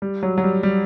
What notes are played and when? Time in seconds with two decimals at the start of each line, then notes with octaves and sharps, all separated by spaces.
0.02 G3
0.23 F#3
0.38 F#3
0.44 G3
0.63 G3